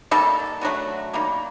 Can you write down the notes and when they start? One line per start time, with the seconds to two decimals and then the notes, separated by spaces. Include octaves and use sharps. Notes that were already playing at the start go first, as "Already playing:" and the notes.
0.11 D#3 G3 A#3 A4
0.61 D3 F#3 A3 F#4
1.13 D#3 G3 A#3